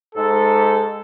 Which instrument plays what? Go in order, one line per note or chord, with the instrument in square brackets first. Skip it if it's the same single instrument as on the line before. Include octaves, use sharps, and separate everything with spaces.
[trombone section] G#2 A4